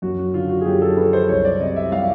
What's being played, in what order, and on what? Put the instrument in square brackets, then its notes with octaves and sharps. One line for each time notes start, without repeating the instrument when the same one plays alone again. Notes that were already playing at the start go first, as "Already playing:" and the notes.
[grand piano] F#2 F#4
F#4
D3 F4
F#4
G#4
F#2 G4
A4
F3 B4
C5
C2 C#5
D5
C3 D#5
E5
G3 F5